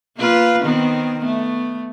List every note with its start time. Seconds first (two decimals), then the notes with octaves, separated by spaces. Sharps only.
0.17 A#3 F4 B4
0.63 D#3 B3 C4
1.20 A3 B3